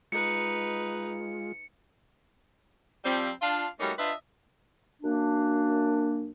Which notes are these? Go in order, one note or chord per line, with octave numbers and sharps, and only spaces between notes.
G#3 D#4 F4 B4 C#7
F3 G3 C4
D4 F4 F5
G3 A3 A#3 C#4 D#4 F#4
D4 F4 B4 C5 D#5 E5
F#2 A#3 D4